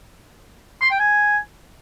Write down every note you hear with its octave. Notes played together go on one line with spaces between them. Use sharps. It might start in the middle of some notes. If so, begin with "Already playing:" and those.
C6
G5
G#5